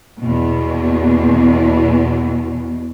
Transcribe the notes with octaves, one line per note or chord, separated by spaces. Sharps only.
E2 B2